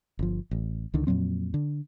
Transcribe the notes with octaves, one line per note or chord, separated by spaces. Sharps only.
G1 F3
A1
C#2 D3 D#3
F2 A#2 F#3 C4
D3